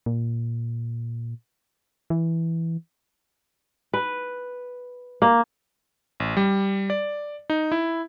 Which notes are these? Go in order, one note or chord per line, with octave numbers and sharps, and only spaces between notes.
A#2
E3
B4
A#3
A1
G3
D5
D#4
E4